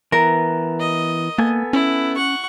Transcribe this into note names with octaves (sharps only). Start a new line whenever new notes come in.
E3 B3 A#4
D#5
A#3 B3 A4 G#5
C#4 E4
F#5 C#6